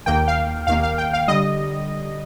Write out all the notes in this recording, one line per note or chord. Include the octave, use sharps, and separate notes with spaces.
D#2 D#3 A#3 G5
F5
D#2 D#3 A#3 F5
F5
G5
F5
D3 G3 D#5